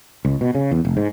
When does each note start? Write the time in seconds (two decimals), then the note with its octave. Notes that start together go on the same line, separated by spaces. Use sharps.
0.25 C#2
0.41 B2
0.55 C#3
0.71 E2
0.85 F1
0.97 G#2